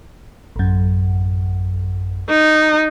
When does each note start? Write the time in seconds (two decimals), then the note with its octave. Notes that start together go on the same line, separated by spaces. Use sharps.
0.56 A1 F#2
2.30 D#4